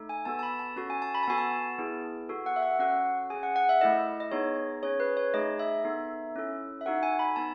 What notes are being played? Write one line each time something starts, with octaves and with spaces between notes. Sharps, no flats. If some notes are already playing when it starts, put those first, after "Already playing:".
Already playing: A3 D#4 A4
G#5
B3 F#4 A4 A5
A5
B5
A5
C#4 F#4 A4 A5
G#5
A5
B5
A5
B3 F#4 A4 G#5
A5
B3 E4 G#4
B3 F#4 A4
F#5
E5
F#5
C#4 F#4 A4 F#5
C#4 G#4 G#5
F#5
F#5
E5
A3 E4 A4 D#5
D#5
B3 D#4 G#4 C#5
C#4 G#4 C#5
B4
C#5
A3 D#4 G#4 D#5
E5
B3 D#4 A4
C#4 E4 A4
E5
D#4 F#4 A4 F#5
G#5
B5
B3 D#4 A5